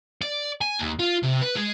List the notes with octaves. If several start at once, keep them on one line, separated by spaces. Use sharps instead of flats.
D5
G#5
D#2
F4
C3
B4
G#3